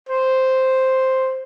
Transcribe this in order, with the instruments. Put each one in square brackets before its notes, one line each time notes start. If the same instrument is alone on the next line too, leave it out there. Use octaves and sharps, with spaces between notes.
[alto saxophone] C5